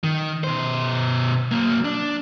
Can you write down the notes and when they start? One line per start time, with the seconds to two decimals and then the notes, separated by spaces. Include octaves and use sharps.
0.04 D#3
0.44 B2 C5
1.52 F#3 A#3
1.85 D4